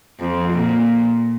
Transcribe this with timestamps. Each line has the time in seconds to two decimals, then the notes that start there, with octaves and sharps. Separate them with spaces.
0.20 F2
0.52 A#2